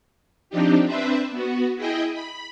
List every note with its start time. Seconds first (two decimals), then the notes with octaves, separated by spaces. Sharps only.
0.50 F3 C4 D4 D#4 G4
0.87 C4 D4 B4 C5 E5
1.31 B3 F#4
1.76 E4 G#4 D#5 G5
2.13 B5